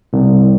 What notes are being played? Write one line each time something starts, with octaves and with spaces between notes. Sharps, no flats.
C2